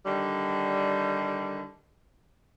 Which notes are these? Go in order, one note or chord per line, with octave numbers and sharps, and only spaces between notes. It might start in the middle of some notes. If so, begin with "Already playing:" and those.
D3 D#3 G3